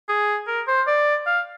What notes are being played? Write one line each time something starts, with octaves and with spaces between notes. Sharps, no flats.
G#4
A#4
C5
D5
F5